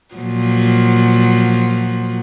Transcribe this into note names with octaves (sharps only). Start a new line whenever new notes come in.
A#2 F3 F#3